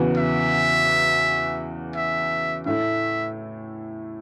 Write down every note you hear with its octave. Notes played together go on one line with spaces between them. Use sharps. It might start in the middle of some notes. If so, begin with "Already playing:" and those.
Already playing: E2 C#3 E3 B3 F#4
E5
E5
A2 A3 E4 E5